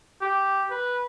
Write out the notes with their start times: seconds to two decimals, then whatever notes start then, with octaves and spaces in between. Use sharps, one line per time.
0.21 G4
0.70 B4